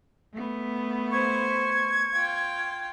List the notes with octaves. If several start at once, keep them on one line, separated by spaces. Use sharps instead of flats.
A3 B3
C5 C#6 G#6
F4 G5